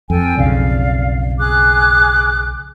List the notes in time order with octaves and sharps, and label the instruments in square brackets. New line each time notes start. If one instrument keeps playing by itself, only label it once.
[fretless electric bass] F2 [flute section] A4 G5 G#5
[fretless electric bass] B1 F2 C#3 [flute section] D5 F5
[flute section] G#4 D6 F#6